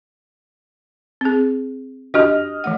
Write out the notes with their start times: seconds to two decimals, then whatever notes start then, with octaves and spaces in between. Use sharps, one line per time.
1.21 C4 G#4
2.14 D4 F#4 G4 D#5 F6
2.64 E3 A3 F#5